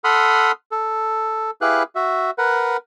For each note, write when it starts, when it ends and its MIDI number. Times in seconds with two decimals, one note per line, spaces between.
0.04 0.52 69
0.04 0.52 78
0.04 0.52 83
0.04 0.52 84
0.04 0.52 87
0.04 0.52 89
0.72 1.51 69
1.61 1.83 64
1.61 1.83 67
1.61 1.83 68
1.61 1.83 71
1.61 1.83 77
1.61 1.83 90
1.95 2.31 66
1.95 2.31 76
2.38 2.77 70
2.38 2.77 71
2.38 2.77 78